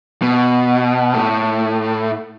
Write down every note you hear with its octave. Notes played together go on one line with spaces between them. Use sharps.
B2
A2